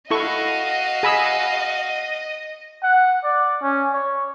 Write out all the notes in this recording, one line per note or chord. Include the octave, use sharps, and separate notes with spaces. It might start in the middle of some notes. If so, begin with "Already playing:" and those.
E4 F#4 A4 D#5 F5 C#6
G#4 B5 E6
F#5
D5
C#4
C#5